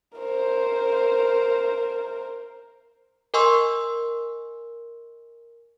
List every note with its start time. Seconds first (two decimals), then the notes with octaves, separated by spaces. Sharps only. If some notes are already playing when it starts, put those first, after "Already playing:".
0.18 A#4 C5
3.34 A#4 D#5 G#5 C6 C#6 E6